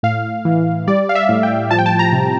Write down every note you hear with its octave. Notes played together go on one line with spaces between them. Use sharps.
A2 F5
E3
G3 D5
F5
E5
A2
G5
F3 A5
G5
A5
A#5
C3